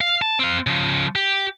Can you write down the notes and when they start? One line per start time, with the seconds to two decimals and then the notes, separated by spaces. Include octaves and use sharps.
0.01 F5
0.22 A5
0.39 C4 F5
0.67 C#3 F3
1.16 G4